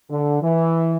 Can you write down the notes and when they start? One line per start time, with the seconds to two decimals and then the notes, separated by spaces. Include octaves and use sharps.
0.10 D3
0.42 E3